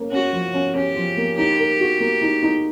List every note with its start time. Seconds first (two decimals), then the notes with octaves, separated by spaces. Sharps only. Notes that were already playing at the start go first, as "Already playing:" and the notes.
Already playing: A#3 C#4
0.11 C#4 F#4
0.32 F3
0.54 C#4
0.74 C#4 G4
0.95 F3
1.17 A#3
1.37 D#4 G4
1.59 A#4
1.80 F#4
2.00 A#3
2.22 D#4
2.43 D#4